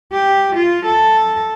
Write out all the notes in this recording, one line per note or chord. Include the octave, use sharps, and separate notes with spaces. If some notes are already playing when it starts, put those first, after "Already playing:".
G4
F4
A4